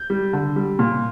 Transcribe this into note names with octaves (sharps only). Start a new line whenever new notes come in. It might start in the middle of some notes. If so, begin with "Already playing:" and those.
Already playing: G6
G3
D3
G3
A#2